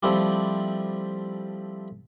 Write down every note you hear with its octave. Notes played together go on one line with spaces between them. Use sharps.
F3 G3 A3 C4 E4 G4